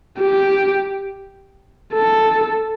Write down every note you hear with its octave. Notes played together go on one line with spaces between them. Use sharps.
G4
A4